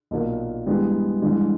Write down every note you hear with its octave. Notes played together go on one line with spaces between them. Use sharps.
B1 A#2 A#3
G2 E3 G#3 B3 G4
G2 E3 G#3